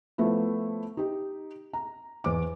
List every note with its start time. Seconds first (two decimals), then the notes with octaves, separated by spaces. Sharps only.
0.18 F3 A3 B3 E4
0.97 D#4 G4
1.73 A#5
2.24 E2 D6